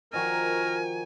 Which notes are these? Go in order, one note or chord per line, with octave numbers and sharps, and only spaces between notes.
D#3 F3 F#4 A#4 G#5